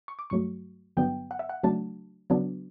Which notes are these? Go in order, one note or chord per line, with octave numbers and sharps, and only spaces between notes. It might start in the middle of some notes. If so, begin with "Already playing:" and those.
C#6
D6
G2 F#3 A3 C#6
G2 D3 F#3 B3 D4 G5
F#5
E5
F#5
C#3 F#3 A3 D4 A5
C#3 F#3 B3 D4